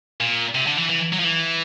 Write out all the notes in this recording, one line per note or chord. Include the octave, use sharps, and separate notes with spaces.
A#2
C3
D3
E3
E3
F#3
F3
E3